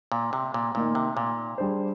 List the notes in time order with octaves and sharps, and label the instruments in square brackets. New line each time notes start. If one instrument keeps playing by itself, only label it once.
[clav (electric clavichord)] A#2
C3
A#2
[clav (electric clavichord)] A#2 [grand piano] D#3 A#3 D#4
[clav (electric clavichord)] C3
A#2
[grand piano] G3 D4 G#4 C5